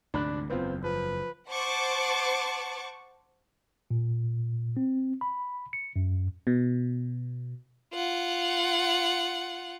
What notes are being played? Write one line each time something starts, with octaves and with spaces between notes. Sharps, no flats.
D2 G#2 C3 D4 B5 F#6
F#1 E2 B3 C4 F4
F3 B4
C5 F#5 A5 C#6 D6
A#2
C4
B5
C#7
F#2
B2
F4 F#5